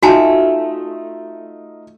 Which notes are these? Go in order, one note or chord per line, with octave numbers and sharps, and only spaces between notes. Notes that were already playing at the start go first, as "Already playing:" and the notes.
A3 D#4 F4 F#4 G#5 A5